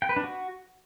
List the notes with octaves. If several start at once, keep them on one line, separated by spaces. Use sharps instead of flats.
G5
B4
D4
F#4